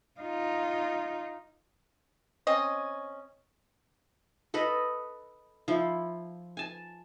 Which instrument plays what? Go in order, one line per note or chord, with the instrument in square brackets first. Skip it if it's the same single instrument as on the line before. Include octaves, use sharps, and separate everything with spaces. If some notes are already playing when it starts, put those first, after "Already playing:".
[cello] D#4 F4
[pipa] C4 C#4 D#5
[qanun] A4 B4 D#5 B5
F3 E4
G#5 A5